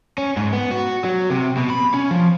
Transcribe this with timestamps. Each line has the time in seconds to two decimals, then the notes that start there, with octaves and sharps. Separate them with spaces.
0.18 C#4
0.37 G#2
0.53 B3
0.71 F#4
1.04 F#3
1.30 C3
1.57 B2
1.70 B5
1.94 C#4
2.11 F3